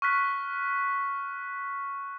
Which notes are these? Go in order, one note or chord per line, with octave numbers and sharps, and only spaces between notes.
C#6 F6 F#6 B6